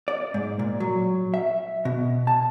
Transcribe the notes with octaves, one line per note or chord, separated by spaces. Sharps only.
D5
G#2
A#2
F#3
E5
B2
A5